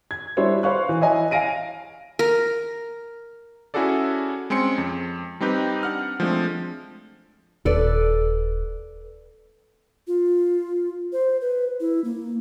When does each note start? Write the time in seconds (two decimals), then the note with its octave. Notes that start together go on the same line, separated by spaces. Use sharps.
0.11 G#6
0.37 G3 D4 E4 C5 C#5 E5
0.63 B4 C5 F5 C#6 F#6
0.89 E3
1.01 E4 C#5 D#5 G#5
1.31 F5 G#5 A#6 D7 D#7
2.19 A#4
3.74 C#4 E4 F#4 G#4 A4 D5
4.50 G#3 C4 C#4 C6 C#7
4.78 F2
5.40 G3 C4 D#4 G4 B4
5.83 D4 F#5 F6
6.20 F3 G#3 A3 C4 D4
7.65 D#1 A4 B4 D5
10.07 F4
11.13 C5
11.41 B4
11.80 E4
12.04 A#3